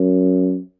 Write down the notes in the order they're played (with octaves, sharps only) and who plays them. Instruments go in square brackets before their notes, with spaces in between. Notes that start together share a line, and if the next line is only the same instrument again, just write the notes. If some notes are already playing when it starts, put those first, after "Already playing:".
Already playing: [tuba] F#2